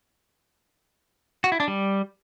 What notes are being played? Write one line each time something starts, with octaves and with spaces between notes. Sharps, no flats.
F#4
E4
D4
G3